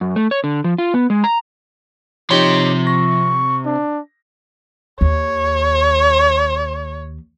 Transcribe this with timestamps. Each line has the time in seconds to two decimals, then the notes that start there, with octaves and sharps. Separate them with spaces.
0.01 F#2
0.16 A3
0.31 C#5
0.44 D3
0.64 F3
0.78 F4
0.94 B3
1.10 G#3
1.24 A#5
2.31 C3 F3 D#4 G4 C#5 C6
2.87 C#6 A#6
3.65 D4
5.01 D#2 C#5